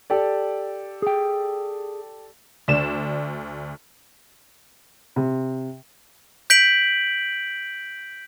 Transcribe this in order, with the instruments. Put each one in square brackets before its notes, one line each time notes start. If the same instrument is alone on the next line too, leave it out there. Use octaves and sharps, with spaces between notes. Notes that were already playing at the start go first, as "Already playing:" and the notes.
[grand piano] G4 A4 D5
[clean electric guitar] G#4 G5
[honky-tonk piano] D2 D5 E7
[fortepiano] C3
[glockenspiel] G6 B6 D7 F#7